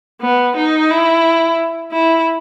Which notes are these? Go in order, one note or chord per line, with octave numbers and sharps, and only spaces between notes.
B3
D#4
E4
E4